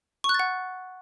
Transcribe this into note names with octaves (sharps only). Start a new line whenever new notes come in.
C#6
F#6
A6
F#5